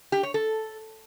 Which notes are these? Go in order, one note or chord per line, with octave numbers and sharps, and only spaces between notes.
G4
C#5
A4